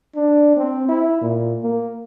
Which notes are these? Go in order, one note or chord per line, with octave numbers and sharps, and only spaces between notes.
D4
C4
E4
A#2
A#3